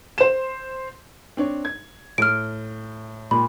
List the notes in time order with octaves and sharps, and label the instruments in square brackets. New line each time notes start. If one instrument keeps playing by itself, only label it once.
[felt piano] C5 E7
[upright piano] C4 D4 C#5
G#6
[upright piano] A2 [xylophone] F6 D7
[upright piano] A#2 [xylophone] B5